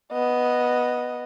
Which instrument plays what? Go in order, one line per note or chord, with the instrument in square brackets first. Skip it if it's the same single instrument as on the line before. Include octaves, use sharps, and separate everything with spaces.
[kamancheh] B3 D#5